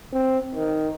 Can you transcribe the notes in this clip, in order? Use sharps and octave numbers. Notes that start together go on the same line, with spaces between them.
C4
D#3